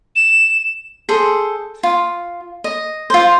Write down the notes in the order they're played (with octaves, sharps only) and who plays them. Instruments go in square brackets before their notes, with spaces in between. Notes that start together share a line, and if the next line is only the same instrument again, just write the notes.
[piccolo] E7
[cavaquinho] G#4 A4 C5
F4
D#5
F4 C5